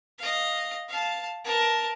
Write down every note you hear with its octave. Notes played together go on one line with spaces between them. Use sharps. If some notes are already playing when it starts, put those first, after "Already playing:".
D#5 F5
F5 A5
A#4 A5